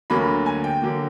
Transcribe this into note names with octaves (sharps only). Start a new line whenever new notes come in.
D2 D3 F#3 A#3 B5
G#5
G5
D3 F#3 A#3